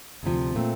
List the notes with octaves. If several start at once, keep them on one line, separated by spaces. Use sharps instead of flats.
D2 C3 F3
A#2 A3 C4